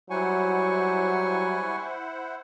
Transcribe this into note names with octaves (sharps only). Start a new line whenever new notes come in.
F#3 G3 E4 C5 F#5 G#5 C#6